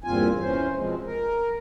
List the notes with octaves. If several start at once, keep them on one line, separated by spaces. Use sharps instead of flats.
E2 G2 A#2 C4 F4 G#5
E3 C#4 C5
B2 F3 G#3 C4
A#4